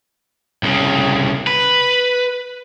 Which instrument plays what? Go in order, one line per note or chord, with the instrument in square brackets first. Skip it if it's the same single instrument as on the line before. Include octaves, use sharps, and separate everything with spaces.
[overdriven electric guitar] C2 C#3
B4